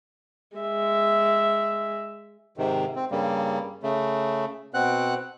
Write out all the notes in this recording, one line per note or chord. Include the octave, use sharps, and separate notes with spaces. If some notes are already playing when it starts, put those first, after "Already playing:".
G#3 E5
G#2 C3 D#3
C4
G2 C#3 G3 A#3
C#3 A3
B2 C4 F#5 F#6